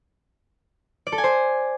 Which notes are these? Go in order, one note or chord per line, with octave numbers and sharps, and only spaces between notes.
D5
A4
G#5
C5